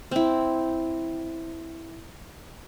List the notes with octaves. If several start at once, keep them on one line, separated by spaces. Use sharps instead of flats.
C4 E4